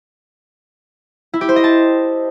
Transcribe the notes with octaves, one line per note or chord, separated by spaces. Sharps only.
E4
G4
C5
D#5
A5